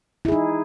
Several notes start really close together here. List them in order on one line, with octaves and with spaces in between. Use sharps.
E4 G#4 D#4